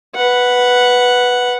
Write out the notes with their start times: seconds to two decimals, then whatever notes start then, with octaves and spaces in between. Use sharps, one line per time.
0.16 B4 F#5